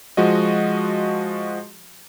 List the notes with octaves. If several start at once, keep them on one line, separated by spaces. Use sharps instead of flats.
F3 G#3 F#4 D#5